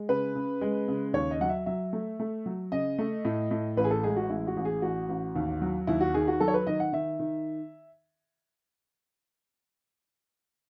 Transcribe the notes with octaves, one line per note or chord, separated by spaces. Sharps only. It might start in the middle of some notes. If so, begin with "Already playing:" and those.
Already playing: G#3
C#3 B4
C#3
G#3
C#3
D#2 C#5
D#5
F#3 F#5
E5
F#3 E5
A3
A3
F#3
C#3 D#5
A3
A2
A2
A1 B4
G#4
A4
G#3 G#4
F#4
A1 E4
F#4
A1
G#4
A1 F#4
A1
D#2
F#3
D#2 E4
F#4
D#3 G#4
F#4
F#3 A4
C#5
B4
D#3 D#5
F#5
D#3 E5
D#3